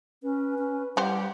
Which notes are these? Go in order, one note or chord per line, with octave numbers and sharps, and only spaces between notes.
C#4 B4
C#4
E3 G3 G4 C5 F5 F#5